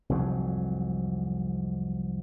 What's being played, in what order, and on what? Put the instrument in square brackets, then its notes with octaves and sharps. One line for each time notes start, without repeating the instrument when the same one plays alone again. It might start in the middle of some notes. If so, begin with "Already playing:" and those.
[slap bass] C2 F2 G#2 F#3